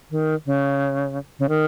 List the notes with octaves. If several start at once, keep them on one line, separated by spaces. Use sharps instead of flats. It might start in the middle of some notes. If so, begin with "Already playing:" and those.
D#3
C#3
C#3
D#3